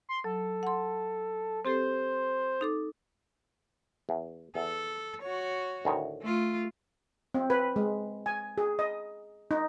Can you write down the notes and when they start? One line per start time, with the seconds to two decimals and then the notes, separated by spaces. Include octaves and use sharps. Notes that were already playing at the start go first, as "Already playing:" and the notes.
0.09 C6
0.24 F#3 A4
0.63 F#5 C6
1.65 C4 G4 A4 C5
2.61 D#4 A4 D6
4.09 E2
4.55 E2 A4
5.22 F#4 C#5
5.85 D2 A2 D#3
6.22 A3 F4
7.34 C4
7.50 B4
7.76 G#3
8.26 G#5
8.58 G#4
8.79 D#5
9.51 D#4